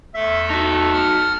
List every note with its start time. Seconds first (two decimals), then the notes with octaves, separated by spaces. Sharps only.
0.15 E2 A3 A4 E5
0.50 D#4 F#4 A5
0.93 F#5 F6